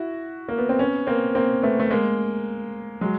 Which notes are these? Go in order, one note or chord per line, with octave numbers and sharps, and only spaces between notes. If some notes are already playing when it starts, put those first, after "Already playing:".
Already playing: E4 F#4
A#3
B3
C4
B3 C#4
A#3 C4
A#3 C4
A3 B3
A3
G#3 A#3
F#3 G#3